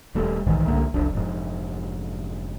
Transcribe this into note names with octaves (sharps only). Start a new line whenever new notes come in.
D#1 G3 A3
B1 G#2 D#3 E3
C2 D3 A3 A#3
F1 C2 D4
F1 G#2